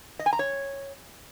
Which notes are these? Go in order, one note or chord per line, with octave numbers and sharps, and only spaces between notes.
D#5
G#5
A#5
C#5